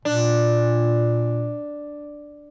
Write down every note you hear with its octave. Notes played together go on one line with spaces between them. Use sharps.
A#2 D4